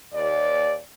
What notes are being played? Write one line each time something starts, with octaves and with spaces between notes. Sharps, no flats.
D#2 D5